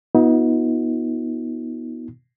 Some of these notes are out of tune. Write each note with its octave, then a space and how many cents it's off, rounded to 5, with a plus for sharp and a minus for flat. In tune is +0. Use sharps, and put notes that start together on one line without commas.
B3 -15 D#4 +35 F#4 -40